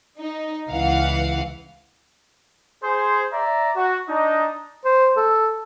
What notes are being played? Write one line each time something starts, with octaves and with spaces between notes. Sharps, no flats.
D#4
C#2 E3 F5 F#5
G#4 C5
D5 E5 A#5
F#4
D4 D#4
C5
A4